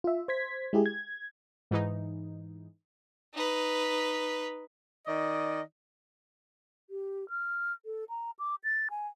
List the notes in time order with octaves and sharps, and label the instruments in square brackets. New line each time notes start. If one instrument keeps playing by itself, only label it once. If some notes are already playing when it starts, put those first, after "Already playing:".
[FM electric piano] F4 E5
C5 G#6 B6
G#3 E4 G4 G#4
G#6
[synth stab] G#2 E3 D#4
[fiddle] D#4 B4
[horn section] D#3 D5 D#5
[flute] G4
F6
A4
A#5
D6
A6
G#5